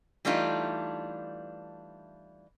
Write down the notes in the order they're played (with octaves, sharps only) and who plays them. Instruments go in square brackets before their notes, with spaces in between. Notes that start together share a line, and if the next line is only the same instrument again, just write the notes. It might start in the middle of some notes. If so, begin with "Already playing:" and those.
[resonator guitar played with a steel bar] E3 G3 A3 D4 D#4 F4